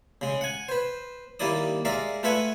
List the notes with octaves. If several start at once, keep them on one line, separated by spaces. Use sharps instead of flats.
C#3 G#3
F#5 G#5
B4 C5
D#2 G3 A#3 E4 D5 D#6
G#3 A#4 D5 E5 F5
A3 F4 B4 E5 F#5 G#5